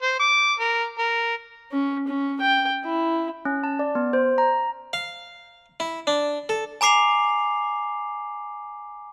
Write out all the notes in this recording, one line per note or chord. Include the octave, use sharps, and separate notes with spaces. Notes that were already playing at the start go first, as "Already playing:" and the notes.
C5
D6
A#4
A#4
C#4
C#4
G5
E4
C#4
A5
D5
B3
C5
A#5
F5
E4
D4
A4
G#5 A#5 D6 C7 F7